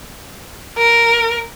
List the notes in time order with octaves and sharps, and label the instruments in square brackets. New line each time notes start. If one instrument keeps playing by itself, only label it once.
[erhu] A#4